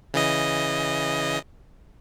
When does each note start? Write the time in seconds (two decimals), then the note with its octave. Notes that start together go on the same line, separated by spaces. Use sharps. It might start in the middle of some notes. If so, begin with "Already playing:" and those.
0.14 C#3 E3 D#5